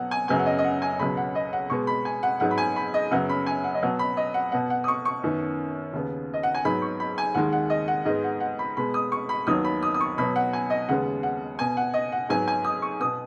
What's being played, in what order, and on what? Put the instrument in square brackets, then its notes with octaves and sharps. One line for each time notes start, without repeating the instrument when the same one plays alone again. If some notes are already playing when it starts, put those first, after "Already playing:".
Already playing: [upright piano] B2 F#3 B3 F#5
G#5
F#2 C#3 F#3 B3 G#5
F#5
D#5
D#5
F#5
G#5
C#2 B2 F#3 B3 B5
F#5
D#5
F#5
B2 G#3 B3 C#6
B5
G#5
F#5
G#2 F#3 B3 F#5
B5
G#5
B5
D#5
F#2 C#3 F#3 B3 F#5
B5
G#5
F#5
D#5
B2 F#3 B3 F#5
B5
D#5
F#5
B2 B3 F#5
F#5
D#6
C#6
C#6
F#2 D#3 B3
D#2 C#3 B3
D#5
F#5
G#5
G#2 F#3 B3 B5
C#6
B5
G#5
D#2 D#3 G#3 F#5
F#5
D#5
F#5
G#2 G#3 B3 D#5
F#5
F#5
B5
B2 G#3 B3 B5
D#6
C#6
B5
D#2 D#3 F#3 B3 D#6
B5
D#6
D#6
C#6
B2 F#3 B3 B5
F#5
G#5
D#5
D#2 C#3 G#3 B3 F#5
F#5
B2 B3 G#5
F#5
D#5
F#5
G#2 F#3 B3 G#5
G#5
D#6
C#6
B2 B3 D#6